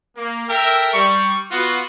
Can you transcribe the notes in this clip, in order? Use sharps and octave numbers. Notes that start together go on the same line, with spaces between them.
A#3
A4 A#4 E5 G5
G3 C#6
B3 F4 F#4